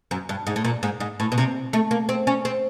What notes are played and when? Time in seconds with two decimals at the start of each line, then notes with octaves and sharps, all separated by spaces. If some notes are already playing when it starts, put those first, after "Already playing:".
0.11 F#2
0.29 G2
0.47 G#2
0.56 A2
0.65 A#2
0.83 G#2
1.00 G#2
1.20 A2
1.32 B2
1.38 C3
1.73 A3
1.91 A#3
2.09 C4
2.27 C#4
2.45 C4